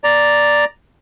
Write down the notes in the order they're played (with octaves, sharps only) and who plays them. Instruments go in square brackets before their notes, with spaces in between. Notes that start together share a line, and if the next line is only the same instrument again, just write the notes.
[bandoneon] D5 A#5